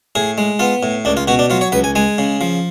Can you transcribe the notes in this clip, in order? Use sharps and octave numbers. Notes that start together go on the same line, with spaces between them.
A2 G#4
G#3
B3 F4
A2
C#2 D4
F4
B2 F#4
D4
F#3 F4
C#5
C#2 B4
G#5
G#3 G#5
C#3
F3